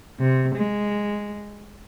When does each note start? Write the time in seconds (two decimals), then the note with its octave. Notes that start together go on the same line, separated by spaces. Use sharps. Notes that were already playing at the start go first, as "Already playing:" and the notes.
0.20 C3
0.56 G#3